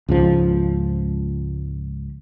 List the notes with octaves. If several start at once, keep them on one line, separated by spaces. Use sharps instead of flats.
C#2 G#2 F3